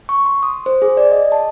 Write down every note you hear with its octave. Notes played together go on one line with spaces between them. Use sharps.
C#6
C6
D#6
C5
G#4
D5
D#5
A5